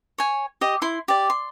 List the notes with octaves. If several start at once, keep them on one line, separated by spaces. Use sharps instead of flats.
C#5 G#5
G4 D#5
E4 C6
G4 D5
C6